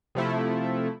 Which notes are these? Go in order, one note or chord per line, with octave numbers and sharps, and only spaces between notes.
C3 F3 A3 E4